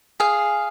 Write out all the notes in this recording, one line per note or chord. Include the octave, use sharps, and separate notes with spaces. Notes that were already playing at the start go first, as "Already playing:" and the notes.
G#4 F5